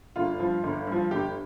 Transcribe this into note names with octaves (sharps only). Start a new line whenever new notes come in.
G1 F4
G2 F3
G1
G2 F3
G1 G4